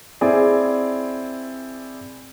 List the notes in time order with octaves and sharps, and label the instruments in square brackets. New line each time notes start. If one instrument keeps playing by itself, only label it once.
[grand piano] C4 E4 G#4 D5